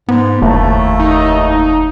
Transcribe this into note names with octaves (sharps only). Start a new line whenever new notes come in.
G#2 B3
F1 D#2 A3 E4 A5
D#4